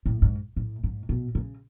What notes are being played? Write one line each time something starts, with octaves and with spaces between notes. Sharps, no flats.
A2
G#2
A2
G#2
B2
C#3